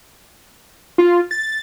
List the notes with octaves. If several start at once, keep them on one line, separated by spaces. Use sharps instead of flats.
F4
A6